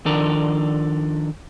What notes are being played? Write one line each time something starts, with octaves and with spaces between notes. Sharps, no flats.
D#3 F3 D4 A4 A#4 D5